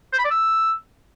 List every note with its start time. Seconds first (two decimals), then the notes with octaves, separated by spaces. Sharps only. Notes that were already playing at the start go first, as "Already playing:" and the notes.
0.13 C5
0.19 B5
0.25 D5
0.30 E6